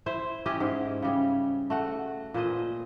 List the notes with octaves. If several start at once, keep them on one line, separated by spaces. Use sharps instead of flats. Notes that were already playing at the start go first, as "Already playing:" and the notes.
E4 C5 E5
C#4 E4 G4 D#5
G#2
C#3 G3 G#3
A3 F#4 F#5
A#2 B4 C5 D#5